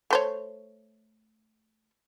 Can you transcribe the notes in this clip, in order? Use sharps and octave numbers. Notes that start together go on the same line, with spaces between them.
A3 C5 C#5